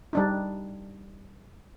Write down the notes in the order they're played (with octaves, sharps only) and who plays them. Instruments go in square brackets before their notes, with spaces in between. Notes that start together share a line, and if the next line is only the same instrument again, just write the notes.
[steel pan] G3 D4 D#4